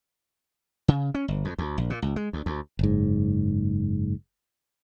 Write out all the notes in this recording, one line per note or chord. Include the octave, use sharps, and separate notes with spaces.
C#3
C#4
G1
F2
D2
A#1
A#2
C#2
G#3
D2
D2
F#1 G#2